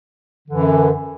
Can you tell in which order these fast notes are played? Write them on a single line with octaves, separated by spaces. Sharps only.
D3 E3 F#2